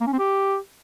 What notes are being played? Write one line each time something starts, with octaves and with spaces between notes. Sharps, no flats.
A#3
C#4
C4
G4